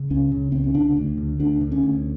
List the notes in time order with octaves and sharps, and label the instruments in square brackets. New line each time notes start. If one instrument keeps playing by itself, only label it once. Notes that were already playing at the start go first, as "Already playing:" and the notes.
Already playing: [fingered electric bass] C#3
C#2 C#4
C#3
C#2 C4
C#4
D3 D4
D2
D3
D2 D4
D3
C#4
D2